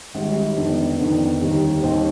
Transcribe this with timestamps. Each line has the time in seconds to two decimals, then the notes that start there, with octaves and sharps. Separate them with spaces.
0.15 G#1 G#2 G3
0.56 F2 D#3 B3 D4
0.99 F2 D#3 B3 D4
1.41 D#2 D#3 G3 C4
1.83 D#2 D#3 G3 C4